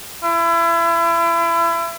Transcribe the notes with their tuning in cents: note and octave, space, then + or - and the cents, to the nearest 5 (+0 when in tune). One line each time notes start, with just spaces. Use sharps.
E4 +35